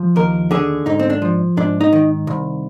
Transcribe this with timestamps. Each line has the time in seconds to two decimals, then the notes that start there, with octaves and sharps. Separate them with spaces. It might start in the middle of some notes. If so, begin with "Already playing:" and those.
Already playing: F3
0.16 D#2 A#4
0.51 D3 G#4
0.86 G#2 D#4
0.99 C4
1.10 D4
1.22 F3
1.57 G#2 D4
1.81 D#4
1.92 D#3
2.27 C2